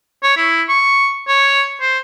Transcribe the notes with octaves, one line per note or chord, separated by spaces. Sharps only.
C#5
E4
C#6
C#5
C5